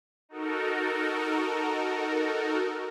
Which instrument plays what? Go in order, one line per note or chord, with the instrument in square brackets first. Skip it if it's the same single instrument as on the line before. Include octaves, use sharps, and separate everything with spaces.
[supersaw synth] D#4 F#4 A4 A#4